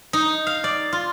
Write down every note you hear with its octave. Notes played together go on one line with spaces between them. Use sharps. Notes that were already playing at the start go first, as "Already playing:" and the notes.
D#4
F5
D5
F4